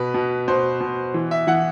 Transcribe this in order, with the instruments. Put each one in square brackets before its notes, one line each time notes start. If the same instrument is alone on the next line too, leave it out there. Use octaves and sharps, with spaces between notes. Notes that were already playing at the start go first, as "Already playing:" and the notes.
Already playing: [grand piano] B2 B4
B2
B2 C5
B2
E3
E5
E3 F#5